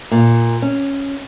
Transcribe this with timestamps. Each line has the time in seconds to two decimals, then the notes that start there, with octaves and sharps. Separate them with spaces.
0.11 A#2
0.62 C#4